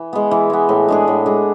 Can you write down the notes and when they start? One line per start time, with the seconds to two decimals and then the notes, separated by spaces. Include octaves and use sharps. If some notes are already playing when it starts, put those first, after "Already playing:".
Already playing: E3
0.13 G#3 B3
0.31 E3
0.50 G#3 B3
0.69 A2
0.88 G#3 D4 G#4
1.08 A2
1.26 G#3 D4 G#4